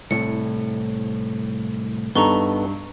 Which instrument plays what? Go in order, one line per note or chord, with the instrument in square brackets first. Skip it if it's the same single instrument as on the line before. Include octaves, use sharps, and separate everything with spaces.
[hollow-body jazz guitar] C2 A2 [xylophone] C#7
[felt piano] G2 [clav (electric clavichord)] B3 D#4 A4 [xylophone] A#5 C#6 G7